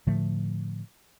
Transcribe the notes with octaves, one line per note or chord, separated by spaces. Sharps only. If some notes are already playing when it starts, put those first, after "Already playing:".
A2 D3 F3 A3